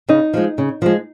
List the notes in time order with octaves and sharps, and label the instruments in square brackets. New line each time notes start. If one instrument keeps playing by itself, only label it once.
[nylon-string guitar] C#3 [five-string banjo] D#4
[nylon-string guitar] F3 G#3
C#3
F3 G#3